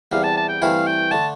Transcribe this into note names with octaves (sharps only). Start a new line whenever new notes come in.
E2 C3 G3 F5
A5
A5
G5
G2 E3 A3 C4 E4 F5
G5
D3 A3 A5